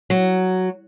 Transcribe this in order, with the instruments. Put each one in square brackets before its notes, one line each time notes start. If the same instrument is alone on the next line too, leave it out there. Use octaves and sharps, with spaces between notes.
[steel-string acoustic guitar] F#3